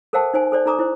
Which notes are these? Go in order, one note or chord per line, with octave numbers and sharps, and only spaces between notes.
A4 A#4 C5 F5 G5 A5
D#4 C5 G#5
A4 C5 D5
D#4 A4 A#5 D6 D#6
E4 C5